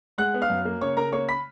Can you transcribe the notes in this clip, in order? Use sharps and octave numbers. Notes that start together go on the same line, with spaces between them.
G#3 F#5 F#6
B3
F5 F6
F#2
A#3
C#3 C#5 C#6
C#3 A#4 A#5
A#3 C#5 C#6
B5 B6